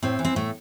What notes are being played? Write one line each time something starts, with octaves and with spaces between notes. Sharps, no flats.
A2 C4
E3
C4
A2 A3